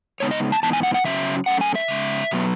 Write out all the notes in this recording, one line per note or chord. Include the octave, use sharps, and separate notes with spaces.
C#3 G#3 B3 D#4 C#5
D#5
A5
G#2 E3 B3 D#4 A5
G#5
F#5
F#5
C#3 F#3 C#4 E5
F#2 E3 A3 C#4 F#5
G#5
E5
C#3 G#3 C#4
B2 F#3 B3